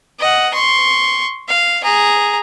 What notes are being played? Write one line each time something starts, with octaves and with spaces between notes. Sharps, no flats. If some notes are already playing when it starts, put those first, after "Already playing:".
D#5 F#5
C6 C#6
F5
G#4 A#5